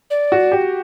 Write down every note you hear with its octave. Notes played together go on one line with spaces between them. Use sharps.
D5
F#4
G4